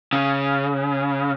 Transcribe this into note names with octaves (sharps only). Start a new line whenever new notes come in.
C#3